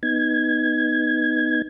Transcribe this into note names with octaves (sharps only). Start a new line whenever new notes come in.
B3 D#4 G#6